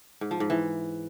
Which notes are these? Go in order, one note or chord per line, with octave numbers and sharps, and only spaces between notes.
G#2
F3
G#2
E3